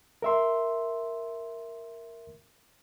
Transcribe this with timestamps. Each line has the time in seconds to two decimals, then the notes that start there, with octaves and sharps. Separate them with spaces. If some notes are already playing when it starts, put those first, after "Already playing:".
0.22 A#4 E5 C6